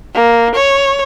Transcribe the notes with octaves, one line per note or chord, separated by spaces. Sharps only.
A#3
C#5